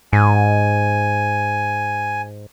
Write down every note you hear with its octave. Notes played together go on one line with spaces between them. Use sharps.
G#2 G#5